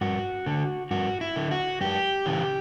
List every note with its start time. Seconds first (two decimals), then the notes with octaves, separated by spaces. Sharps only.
0.01 G2 F#4
0.46 D3
0.91 G2 F#4
1.21 E4
1.36 D3
1.51 F#4
1.81 F#2 G4
2.26 C#3 E3